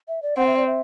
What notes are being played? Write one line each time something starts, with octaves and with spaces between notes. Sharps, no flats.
E5
D5
C4 F#5
E5
D5
E5